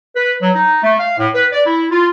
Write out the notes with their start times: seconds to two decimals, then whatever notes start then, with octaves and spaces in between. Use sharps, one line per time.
0.15 B4
0.41 F#3
0.54 D#4
0.83 A3
1.00 F5
1.18 A2
1.34 B4
1.52 D5
1.66 E4
1.91 F4